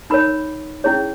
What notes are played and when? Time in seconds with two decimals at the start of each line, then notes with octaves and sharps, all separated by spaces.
0.10 D#4 A#4 C#5 B5
0.84 C#4 E4 G#4 C#5